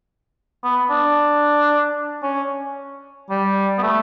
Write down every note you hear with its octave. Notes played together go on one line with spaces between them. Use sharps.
B3
D4
C#4
G3
B3
A3